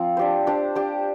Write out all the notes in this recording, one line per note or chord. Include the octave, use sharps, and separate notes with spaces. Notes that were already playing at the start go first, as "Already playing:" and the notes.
Already playing: F3 C4
D4 G4 C5
D4 G4 C5
D4 G4 C5